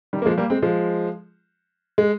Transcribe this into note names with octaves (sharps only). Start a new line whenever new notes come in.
D#3 G3
A#3
F3 G#3
G3 A#3
G#3 C4
F3 G#3
G#3